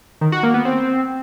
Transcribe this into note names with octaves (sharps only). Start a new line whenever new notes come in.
D#3
F#4
A#3
B3
C4